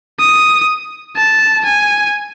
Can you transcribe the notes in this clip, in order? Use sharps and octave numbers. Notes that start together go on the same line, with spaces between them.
D#6
A5
G#5